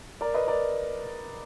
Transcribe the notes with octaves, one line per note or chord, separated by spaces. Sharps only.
A#4 D5
B4 D#5
A#4 D5